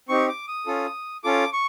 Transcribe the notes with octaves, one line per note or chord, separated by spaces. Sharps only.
C4 D#4 G4 C#6
D6
D#6
C#4 F4 A4
C#4 F4 A4 D6
C#6